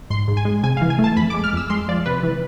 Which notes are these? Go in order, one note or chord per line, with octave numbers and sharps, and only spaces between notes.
G#2 C6
G#2
G#5
G#3
C3 G#5
F5
E3
G#5
A3
A5
F2 B5
D6
G#3
F6
F2 E6
G#3 C6
F3 D5
C3 B4
E3